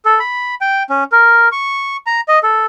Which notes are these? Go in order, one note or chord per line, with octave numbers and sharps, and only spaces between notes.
A4
B5
G5
C#4
A#4
C#6
A#5
D#5
A4